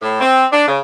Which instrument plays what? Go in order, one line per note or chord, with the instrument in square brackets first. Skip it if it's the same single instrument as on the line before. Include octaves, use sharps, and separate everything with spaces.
[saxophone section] A2
C4
D4
C#3